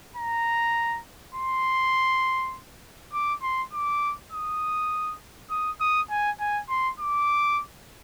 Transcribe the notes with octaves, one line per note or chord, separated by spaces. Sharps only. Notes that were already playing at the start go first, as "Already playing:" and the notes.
A#5
C6
D6
C6
D6
D#6
D#6
D#6
G#5
G#5
C6
D6